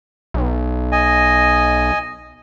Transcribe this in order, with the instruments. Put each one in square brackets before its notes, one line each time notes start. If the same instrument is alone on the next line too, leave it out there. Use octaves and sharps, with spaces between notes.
[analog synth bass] B1
[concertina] D#5 G#5